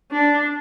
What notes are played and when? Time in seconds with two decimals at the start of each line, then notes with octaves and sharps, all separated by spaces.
0.11 D4